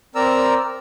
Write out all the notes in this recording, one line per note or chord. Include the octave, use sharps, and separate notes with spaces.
C4 A#4 D5 A#5 E6